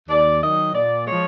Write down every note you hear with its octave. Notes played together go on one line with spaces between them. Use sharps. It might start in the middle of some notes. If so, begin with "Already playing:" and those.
D#2 D5
D#3 F#3 D#5
A#2 D5
F3 G#3 C#5